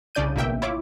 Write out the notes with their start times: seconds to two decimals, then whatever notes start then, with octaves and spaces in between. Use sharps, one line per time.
0.15 C2 C#3 D4 D5 G6 D#7
0.35 A1 B2 A#3 E5 G5
0.62 E4 F4 C#5 D6